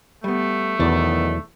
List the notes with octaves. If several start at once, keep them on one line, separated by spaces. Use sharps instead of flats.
G3 A3 B3
B1 E2 D#3 F#3 B3 D4 D5